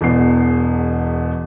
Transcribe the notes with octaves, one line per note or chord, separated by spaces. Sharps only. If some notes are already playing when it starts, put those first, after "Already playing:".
E1 E2 B2 C7